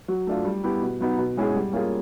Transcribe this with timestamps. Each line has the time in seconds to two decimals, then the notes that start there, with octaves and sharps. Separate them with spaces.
0.08 F#3
0.27 A3 D4 F4
0.45 G3
0.64 B3 E4 G4
0.82 B2
1.00 F#3 B3 D#4
1.18 B2
1.37 G#3 C#4 E4 G#4
1.56 G3
1.73 A#3 C#4 F4 G#4